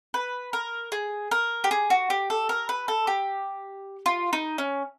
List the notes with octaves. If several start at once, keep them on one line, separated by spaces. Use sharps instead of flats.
B4
A#4
G#4
A#4
G4
G#4
F#4
G4
A4
A#4
B4
A4
G4
F4
D#4
C#4